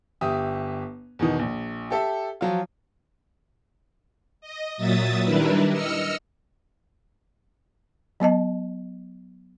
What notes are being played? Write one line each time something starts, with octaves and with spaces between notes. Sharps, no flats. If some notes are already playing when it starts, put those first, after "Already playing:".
G1 G4 E5 D#6
E2 B2 D#3
A#1
G4 A4 E5
F3 F#3 F4
D#5
A#2 F#3 E5 D#6 A6
D#3 G3 D4 E4 A#4 B4
D#5 E6 F6 C#7
F#3 B3 D#5 A5